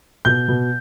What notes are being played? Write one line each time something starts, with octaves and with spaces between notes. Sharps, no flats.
B2 G6
B2